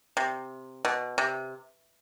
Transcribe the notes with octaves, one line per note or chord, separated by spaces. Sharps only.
C3
B2
C3